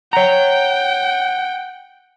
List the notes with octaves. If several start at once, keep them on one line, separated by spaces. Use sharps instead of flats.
C#5 F#5 G5 A#5